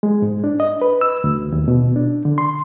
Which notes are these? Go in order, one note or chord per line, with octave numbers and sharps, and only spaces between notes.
G#3
G#2
D4
D#5
B4
E6
D2
D#2
B2
D4
D3
C6